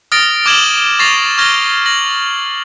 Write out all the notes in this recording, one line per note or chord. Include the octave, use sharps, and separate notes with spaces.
D#6 F6 A6 A#6 D7
D6 F6 G#6 E7 F#7 G7
C#6 A6 A#6 C7 F7
C#6 F6 G#6 A#6 G7
A#6 F#7